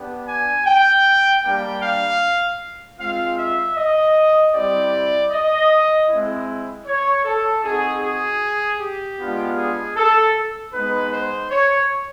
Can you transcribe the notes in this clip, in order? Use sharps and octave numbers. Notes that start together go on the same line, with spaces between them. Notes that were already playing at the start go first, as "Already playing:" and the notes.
Already playing: B3 D4 G4
G#5
G5
G3 A#3 D4 G4 G5
F5
G#3 C4 F4 F5
E5
D#5
G3 C4 E4 G4 D5
D#5
G#3 C4 E4
C#5
A4
C4 D#4 F#4 G#4
G#4
G4
G#3 B3 D4 F4
G#4
A4
G#3 B3 D#4 B4
C5
C#5